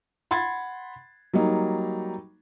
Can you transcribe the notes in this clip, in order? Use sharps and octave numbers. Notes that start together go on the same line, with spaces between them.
F#5 B5 C6 G#6 A6
F#3 G3 A#3 D#4